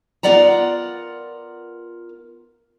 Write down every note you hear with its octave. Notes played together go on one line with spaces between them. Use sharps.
B3 F4 A#4 D5 F#5 A#5